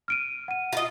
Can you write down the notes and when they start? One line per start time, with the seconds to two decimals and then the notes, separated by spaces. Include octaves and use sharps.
0.08 F6 D7 D#7
0.48 F#5 D#7
0.73 F4 D#5